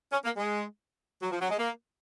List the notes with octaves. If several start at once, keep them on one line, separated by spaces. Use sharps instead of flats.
C#4
A#3
G#3
F#3
F3
F#3
G#3
A#3